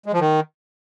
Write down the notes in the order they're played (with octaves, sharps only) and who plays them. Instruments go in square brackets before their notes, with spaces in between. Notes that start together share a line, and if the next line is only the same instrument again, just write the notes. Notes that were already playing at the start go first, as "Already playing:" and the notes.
[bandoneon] G#3
F3
D#3